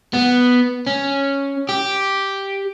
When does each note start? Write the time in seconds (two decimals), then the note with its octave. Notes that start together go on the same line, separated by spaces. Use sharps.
0.14 B3
0.87 C#4
1.69 G4